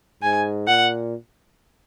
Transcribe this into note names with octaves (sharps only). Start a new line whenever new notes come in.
G#2 G#5
A#2 F#5